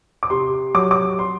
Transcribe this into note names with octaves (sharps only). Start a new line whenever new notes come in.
D6
C3 C6
F#3 D6
D6
C6